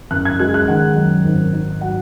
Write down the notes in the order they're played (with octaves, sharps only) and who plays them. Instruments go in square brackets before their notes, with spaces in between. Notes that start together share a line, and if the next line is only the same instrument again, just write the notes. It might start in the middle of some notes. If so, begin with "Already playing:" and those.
[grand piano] F#1 F#6
G#6
G#3 F#6
F#6
D#3 F#5
F#2
G#1
D#4
F#3 F#5